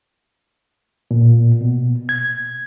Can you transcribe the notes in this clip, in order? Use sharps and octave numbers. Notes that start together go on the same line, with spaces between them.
A#2
B2
G#6